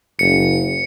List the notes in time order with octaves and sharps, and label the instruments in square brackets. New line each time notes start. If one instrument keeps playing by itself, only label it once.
[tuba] F#1 [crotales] C#7